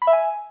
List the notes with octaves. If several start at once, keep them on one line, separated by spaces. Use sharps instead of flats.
B5
E5
G#5